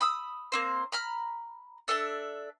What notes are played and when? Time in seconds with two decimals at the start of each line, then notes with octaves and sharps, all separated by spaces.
0.01 B5 D#6 E6
0.52 A#3 C4 C5
0.92 A#5 B5 F6
1.88 D4 A4 E5 A5